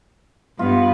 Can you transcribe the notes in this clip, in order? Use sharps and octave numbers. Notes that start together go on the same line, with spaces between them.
G2 B3 F4 F5